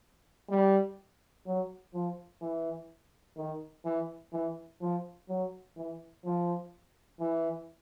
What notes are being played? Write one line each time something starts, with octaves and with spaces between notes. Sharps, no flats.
G3
F#3
F3
E3
D#3
E3
E3
F3
F#3
E3
F3
E3